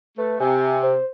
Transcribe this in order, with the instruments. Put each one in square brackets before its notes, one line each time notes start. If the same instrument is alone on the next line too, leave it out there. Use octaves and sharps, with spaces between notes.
[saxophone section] A3 [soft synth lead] B4
[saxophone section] C3 [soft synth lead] G#5
[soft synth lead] C5